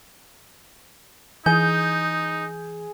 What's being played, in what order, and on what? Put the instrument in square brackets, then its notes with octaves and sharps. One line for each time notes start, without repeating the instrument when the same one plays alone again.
[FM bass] E3 [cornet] D#4 [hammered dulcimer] G#4 [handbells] G6